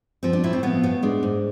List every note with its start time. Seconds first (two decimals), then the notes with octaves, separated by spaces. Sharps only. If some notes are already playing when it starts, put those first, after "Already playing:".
0.23 F3 C4
0.33 D4
0.44 A2 E4
0.53 C4
0.63 F3 B3
0.83 A2 B3
1.03 G#3 D4
1.23 G#2